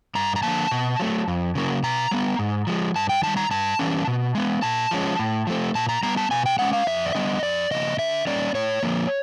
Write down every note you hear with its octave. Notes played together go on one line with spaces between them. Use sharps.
G2 A#5
A#5
D3 F3 A#3 A5
B2
F#3 A3
F2
C#3 F#3 A#3
B2 A#5
G3 B3
G#2
F3 G#3
G2 A5
G5
D#3 G3 A5
A#5
G2 A5
E3 G3 A#3 C#4
B2
G#3 B3
A#2 A5
F3 G#3 C#4
A2
F3 A3 C4
A#2 A5
A#5
G3 B3 A#5
A5
B2 G#5
G5
G#3 C#4 F#5
F5
F2 E5
D5
D3 G3 B3 D#5
F2 D5
C#3 F3 A#3 D#5
D3 E5
G3 A#3 C#4 D5
A2 C#5
F3 A#3